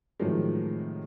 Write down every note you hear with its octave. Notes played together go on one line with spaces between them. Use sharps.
A2 C3 D#3 F3 F#3 G#3